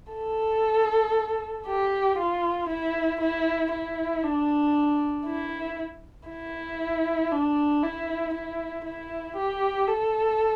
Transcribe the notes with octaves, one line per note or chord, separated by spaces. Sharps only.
A4
G4
F4
E4
E4
E4
D4
E4
E4
D4
E4
E4
E4
G4
A4